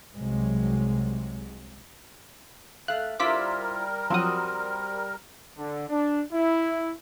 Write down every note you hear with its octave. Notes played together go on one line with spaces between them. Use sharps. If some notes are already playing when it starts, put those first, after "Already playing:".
C2 C3 F#3 G#3
A3 F5 F#6
G3 E4 F4 A#4 C5 D6 B6
F3 F#3 C4 F#4 D#6
D3
D4
E4